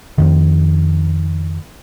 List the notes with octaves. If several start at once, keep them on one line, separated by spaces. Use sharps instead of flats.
F2 D#3